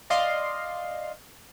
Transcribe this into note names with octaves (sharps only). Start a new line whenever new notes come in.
D5 D#5 F5 C6